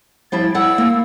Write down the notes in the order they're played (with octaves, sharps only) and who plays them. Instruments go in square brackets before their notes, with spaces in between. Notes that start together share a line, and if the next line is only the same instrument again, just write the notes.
[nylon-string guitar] F3 G3 E4 [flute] A6
[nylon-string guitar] E4 D5 F#5 [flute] E6
[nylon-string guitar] A#3